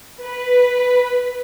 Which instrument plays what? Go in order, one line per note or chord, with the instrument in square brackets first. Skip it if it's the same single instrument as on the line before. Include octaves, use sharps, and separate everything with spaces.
[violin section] B4